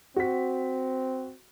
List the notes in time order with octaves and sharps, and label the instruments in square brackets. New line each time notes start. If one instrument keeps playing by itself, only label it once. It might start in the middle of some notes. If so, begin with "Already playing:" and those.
[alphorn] C4 [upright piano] F#4 B6